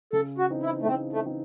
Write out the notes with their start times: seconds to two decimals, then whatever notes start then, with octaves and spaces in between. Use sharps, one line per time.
0.13 C#3 A4
0.38 F#4
0.50 E3 C4 D#4
0.63 E4
0.82 A3
0.87 C#3 C4
1.13 A3
1.25 E3 C4 D#4